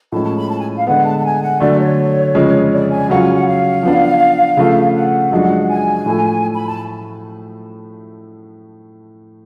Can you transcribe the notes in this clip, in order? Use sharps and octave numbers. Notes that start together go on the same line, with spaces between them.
A2 F3 G#3 C#4 A5
A5
B5
A5
G#5
F5
D3 G#3 B3 F#5
A5
A5
G#5
F#5
D3 F#3 A3 D5
C#5
F2 C#3 F3 G#3 C#4
D5
G#5
C#3 F#3 C#4 F4 F#5
G#5
F#5
F5
F3 B3 D4
C#3 F3 A3
F#5
F#2 F3 G#3 D4 F#4
G#5
A2 F3 A3
B5
A5